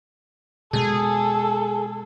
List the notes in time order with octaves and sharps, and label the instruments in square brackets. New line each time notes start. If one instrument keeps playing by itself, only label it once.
[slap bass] B2 G#3 [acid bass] G#4 [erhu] A4